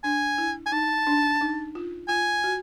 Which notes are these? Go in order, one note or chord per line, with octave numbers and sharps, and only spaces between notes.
D4 G#5
E4
G#5
D#4 A5
D4
D#4
F4
F4 G#5
F#4